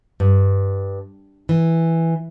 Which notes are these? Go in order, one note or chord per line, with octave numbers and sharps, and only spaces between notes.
G2
E3